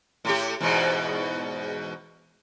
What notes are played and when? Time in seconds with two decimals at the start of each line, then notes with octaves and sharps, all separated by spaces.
0.25 A2 G4
0.60 E2 G#2 B2